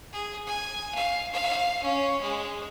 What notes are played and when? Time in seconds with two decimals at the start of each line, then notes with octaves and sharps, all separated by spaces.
0.13 G#4
0.47 G#5
0.95 F5
1.33 F5
1.83 C#4
2.21 G#3